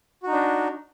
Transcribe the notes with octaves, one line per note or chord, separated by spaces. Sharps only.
D4 D#4 F#4